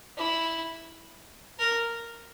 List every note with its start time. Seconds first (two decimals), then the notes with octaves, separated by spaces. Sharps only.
0.17 E4
1.59 A#4